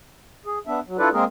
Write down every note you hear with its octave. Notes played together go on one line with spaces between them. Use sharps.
G#4
B3 D4 E5
F#3
D4 E4 F4 A4 B4 D5
G#3 A#3 C4 G#4 A#4